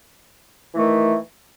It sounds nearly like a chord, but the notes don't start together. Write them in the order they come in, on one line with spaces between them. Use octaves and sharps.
E3 A3 D#3